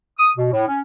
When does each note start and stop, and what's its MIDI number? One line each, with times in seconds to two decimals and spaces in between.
0.18 0.31 87
0.37 0.50 47
0.53 0.64 45
0.68 0.80 61